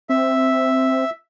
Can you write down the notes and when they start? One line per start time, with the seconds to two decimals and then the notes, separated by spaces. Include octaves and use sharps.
0.09 C4 E5